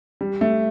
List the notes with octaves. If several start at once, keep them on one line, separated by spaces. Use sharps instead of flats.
G3
A3